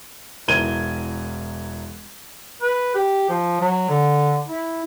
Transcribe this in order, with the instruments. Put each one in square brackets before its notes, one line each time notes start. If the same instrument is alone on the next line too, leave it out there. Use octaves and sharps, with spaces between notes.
[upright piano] E1 E3 A#4 G#6 D#7 G7
[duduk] B4
G4
F3
F#3
D3
E4